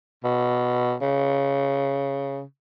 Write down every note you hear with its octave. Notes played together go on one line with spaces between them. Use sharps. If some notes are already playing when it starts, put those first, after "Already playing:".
B2
C#3